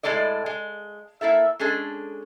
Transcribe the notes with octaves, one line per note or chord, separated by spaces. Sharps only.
A2 F#3 G#3 A4 D5 D#5
G#3
A#3 E4 A4 E5
G#3 C#4 D4 G#4 A4